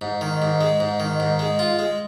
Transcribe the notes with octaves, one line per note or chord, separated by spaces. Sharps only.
G#2
D#3
G#2
G#3
G#2
D#3
G#2
G#3
F4
G#3